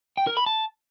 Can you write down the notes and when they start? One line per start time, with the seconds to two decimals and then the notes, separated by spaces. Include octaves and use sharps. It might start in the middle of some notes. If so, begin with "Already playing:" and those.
0.17 G5
0.27 A#4
0.37 B5
0.46 A5